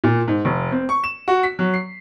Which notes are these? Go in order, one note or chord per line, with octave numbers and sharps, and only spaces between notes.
A#2
G#2
F1
C4
C#6
E7
F#4
B6
F#3
C7